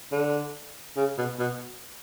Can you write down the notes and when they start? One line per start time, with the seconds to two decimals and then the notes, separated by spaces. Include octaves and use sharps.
0.12 D3
0.97 C#3
1.18 B2
1.39 B2